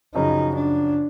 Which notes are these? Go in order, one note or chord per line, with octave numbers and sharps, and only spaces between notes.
F#2 C#3 F3 D#4
D4